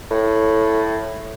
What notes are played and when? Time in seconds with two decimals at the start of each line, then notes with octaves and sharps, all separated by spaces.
0.11 A2